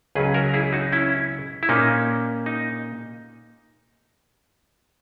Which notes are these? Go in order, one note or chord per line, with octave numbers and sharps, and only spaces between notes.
C#2 C#3 F#3 C#4 G#4 B4
F#4 A#4
E4 G#4
D#4 F#4
C#4 E4
E4
A#2 A#3 C#4 D#4
D#4